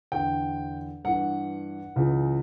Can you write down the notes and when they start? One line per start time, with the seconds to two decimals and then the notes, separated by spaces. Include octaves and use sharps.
0.12 E2 D3 G5
1.04 G2 E3 F#5
1.96 C#2 C#3 E3